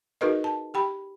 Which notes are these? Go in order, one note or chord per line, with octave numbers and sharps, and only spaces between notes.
D#4 F#4 G#4 A#4 B4 D#5
A5
G4 G5 B5